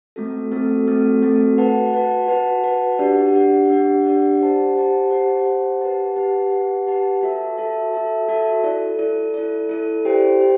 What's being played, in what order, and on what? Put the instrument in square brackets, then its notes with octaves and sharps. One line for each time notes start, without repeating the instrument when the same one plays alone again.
[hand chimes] A3 C4 F#4 A4
A3 C4 F#4 A4
A3 C4 F#4 A4
A3 C4 F#4 A4
F#4 B4 F#5 A5
F#4 B4 F#5 A5
F#4 B4 F#5 A5
F#4 B4 F#5 A5
D4 G4 D5 F#5
D4 G4 D5 F#5
D4 G4 D5 F#5
D4 G4 D5 F#5
G4 C5 F#5 A5
G4 C5 F#5 A5
G4 C5 F#5 A5
G4 C5 F#5 A5
G4 B4 F#5 A5
G4 B4 F#5 A5
G4 B4 F#5 A5
G4 B4 F#5 A5
F#4 A4 E5 A5
F#4 A4 E5 A5
F#4 A4 E5 A5
F#4 A4 E5 A5
E4 A4 D5
E4 A4 D5
E4 A4 D5
E4 A4 D5
E4 G4 C5 G5
G4 C5 G5